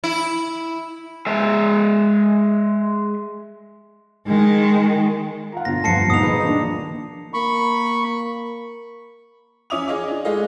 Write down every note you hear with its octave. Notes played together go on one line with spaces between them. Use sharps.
E4
G#3 E5
D#3 G#3
F4 F#5 A#5
G1 B2 D3 A#6
D2 G2 F3 B3 A5 C7 C#7
D#1 B2 A#3 D4 D#4 D#6 F7
D#3 G#4 B4 D#5
F3 A#3 D4 F4
A#3 B5 C#6
F3 C#4 E5 D6 D#6 F7
G#4 C#5 D#5 F5 D6
D4 F4
G#3 A3 G#4 A4 D#5 F5